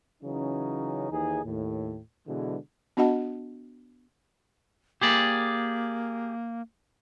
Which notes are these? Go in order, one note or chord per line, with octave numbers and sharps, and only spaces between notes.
C#3 E3 F#3 C#4 D#4
D#2 E3 D#4 G#4
D#2 A2
B2 D3 E3 G#3
B3 D4 F#4 D#5 F#5 A5
A#3 G4 G#4 D5